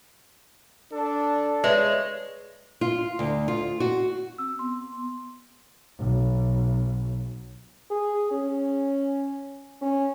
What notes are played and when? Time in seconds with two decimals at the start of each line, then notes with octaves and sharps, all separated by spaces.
0.92 D4 A4
1.64 G#3 B4 C#5 D5 E5
2.81 F4
3.19 D2
3.48 F4
3.80 F#4
4.38 C4 E6
4.59 B3 C6
5.98 B1
7.91 G#4
8.31 C#4
9.82 C#4